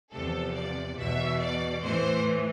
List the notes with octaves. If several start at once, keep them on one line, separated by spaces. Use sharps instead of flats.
E2 C3 F3 A4
D5
E2 B2 E5
D5
A2 E3 C5